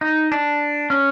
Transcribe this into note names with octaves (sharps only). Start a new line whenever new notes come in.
D#4
D4
C#4